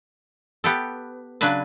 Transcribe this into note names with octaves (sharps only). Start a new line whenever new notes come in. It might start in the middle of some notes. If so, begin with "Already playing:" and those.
B3 G4 A4
C#3 F#3 D4 B4 A5